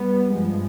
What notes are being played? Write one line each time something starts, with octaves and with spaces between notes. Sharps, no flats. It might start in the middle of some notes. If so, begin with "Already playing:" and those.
Already playing: G3 B3
G2 F3 G#3